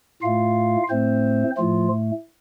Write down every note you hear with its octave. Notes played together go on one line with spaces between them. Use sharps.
A2 A3 F4 F5
A2 A3 C4 C5
A2 F3 A3 F4